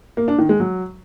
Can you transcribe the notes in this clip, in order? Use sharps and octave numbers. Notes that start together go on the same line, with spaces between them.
A#3
D4
D#3
G#3
F#3